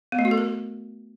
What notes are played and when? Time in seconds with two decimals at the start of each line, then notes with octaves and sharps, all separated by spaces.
0.12 B3
0.19 A3
0.25 F#4
0.31 A4
0.38 A#4